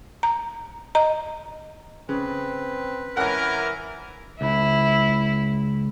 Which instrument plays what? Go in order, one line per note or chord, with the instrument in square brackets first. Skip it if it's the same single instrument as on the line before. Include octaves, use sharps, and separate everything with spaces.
[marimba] A#5
D#5 A#5
[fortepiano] C#3 [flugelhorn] C4 [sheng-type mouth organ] B4
[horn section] E3 A#4 [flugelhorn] C#4 [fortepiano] F#5 F#6
[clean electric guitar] C#2 [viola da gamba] E4